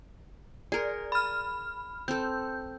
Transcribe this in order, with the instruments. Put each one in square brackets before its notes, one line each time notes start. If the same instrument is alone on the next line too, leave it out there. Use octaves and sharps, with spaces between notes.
[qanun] G#4 A#4 [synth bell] D5
[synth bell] B5 F6
[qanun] C4 A4 [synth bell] G6